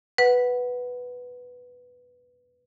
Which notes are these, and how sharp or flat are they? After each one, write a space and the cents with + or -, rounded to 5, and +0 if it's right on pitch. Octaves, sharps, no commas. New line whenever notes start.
B4 +0 F#5 +0